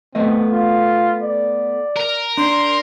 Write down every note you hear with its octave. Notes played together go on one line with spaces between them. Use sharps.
A3 B3 C4 D#5
F4
D5
A#4
D4 C6